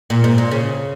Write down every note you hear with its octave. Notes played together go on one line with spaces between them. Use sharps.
A#2
G#2
A#2
C#3